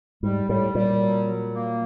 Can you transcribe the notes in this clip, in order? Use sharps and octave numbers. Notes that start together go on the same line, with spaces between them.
G#2 G3
A2 G3
A#2 G3
F#3
F#3
A#3